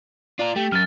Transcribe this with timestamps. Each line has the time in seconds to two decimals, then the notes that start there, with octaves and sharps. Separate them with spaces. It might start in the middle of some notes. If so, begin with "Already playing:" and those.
0.39 F4 A#4 D5
0.56 A3 G4
0.72 F#2 F6 A6